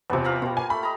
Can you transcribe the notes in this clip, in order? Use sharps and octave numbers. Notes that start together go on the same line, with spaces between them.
E2 C3 F3 B3
F5 A#5 B5
B2 F4 G4
A#3 G#5
A3 B5
D#5 A#5